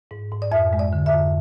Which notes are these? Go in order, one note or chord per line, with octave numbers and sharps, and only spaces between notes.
G#2
G#2
D5
F2 E5
G#3
D5
D3
E5
F2